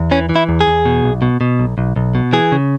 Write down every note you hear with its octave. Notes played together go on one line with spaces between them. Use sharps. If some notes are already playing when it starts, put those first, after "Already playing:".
Already playing: E2
E3 C#4
E3
E4
E2
G#4
E2
B2
B1
B2
B2
B1
B1
B1
B2
E3 G#4
C#3